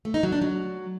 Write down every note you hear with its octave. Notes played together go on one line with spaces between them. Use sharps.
A3
D#4
F#3
D4
F#3